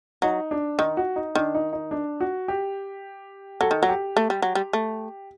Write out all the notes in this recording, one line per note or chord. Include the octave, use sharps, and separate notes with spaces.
F#3 D#4
D4
D#3 D#4
F#4
D#4
D#3 D4
D#4
D#4
D4
F#4
G4
F#3 A4
D#3
F#3 F#4
G4
A3
G3
F#3
G3
A3